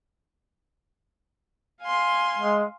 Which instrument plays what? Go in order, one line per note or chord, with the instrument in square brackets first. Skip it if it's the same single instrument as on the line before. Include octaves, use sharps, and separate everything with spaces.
[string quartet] F5 G#5 C6
[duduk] G#3